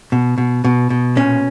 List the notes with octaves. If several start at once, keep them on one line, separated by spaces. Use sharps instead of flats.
B2
B2
B2
B2
A#2 C#4